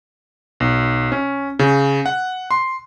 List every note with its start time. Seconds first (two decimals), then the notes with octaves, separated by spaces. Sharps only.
0.60 B1
1.12 C#4
1.59 C#3
2.06 F#5
2.51 C6